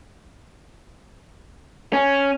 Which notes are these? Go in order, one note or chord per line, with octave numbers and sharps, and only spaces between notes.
C#4